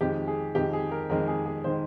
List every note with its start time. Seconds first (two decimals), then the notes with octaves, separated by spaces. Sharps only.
0.01 F2 D#3 G#3 G4
0.28 G#4
0.55 F2 D#3 G#3 G4
0.73 G#4
0.91 A#4
1.09 F2 D#3 G#3 A#4
1.28 G#4
1.46 G#4
1.64 D#3 G#3 C5